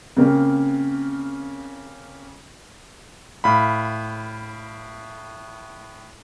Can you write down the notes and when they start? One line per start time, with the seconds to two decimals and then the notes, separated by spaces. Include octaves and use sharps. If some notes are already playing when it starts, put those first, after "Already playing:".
0.17 C#3 A#3 C4
3.44 A2 F5 B5